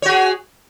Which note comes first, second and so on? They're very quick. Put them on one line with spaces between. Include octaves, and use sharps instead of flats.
C#5 F#4 G#4